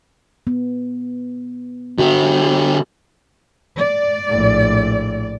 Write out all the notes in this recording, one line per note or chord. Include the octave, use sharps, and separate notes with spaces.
B3
D3 F#4 G4
D5
A#1 A2